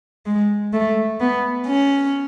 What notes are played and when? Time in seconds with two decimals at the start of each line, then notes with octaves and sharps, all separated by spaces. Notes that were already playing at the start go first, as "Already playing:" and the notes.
0.26 G#3
0.73 A3
1.20 B3
1.68 C#4